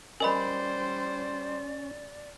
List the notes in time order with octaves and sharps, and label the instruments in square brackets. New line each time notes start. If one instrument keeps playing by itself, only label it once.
[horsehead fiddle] G3 C5 [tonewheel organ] C#4 [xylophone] A#4 D#5 B5 [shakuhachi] D5